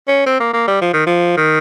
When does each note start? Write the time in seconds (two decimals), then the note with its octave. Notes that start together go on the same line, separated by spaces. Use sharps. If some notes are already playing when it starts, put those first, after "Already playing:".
0.08 C#4
0.26 C4
0.40 A#3
0.53 A#3
0.67 G3
0.82 F3
0.94 D#3
1.07 F3
1.37 D#3